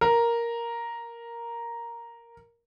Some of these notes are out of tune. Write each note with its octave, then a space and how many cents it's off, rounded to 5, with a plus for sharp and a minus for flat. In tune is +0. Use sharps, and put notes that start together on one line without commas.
A#4 +0